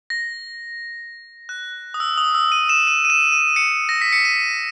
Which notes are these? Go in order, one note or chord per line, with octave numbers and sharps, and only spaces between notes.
A#6
F#6
D#6
E6
D#6
E6
D#7
E7
D#7
D#7
E7
D#7
C#7
A#6
B6
C#7
D#7